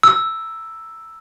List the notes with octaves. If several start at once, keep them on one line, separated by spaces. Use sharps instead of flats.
E6